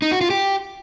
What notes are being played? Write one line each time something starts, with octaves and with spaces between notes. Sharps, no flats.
D#4
F#4
F4
G4